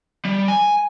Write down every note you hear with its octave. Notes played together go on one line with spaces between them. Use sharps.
G3
G#5